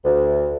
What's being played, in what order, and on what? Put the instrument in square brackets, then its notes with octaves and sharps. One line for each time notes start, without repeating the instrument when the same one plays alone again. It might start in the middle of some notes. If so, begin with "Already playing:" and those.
[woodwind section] D2